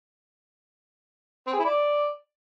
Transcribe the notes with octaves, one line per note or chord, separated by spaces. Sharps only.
C4
G#4
E4
D5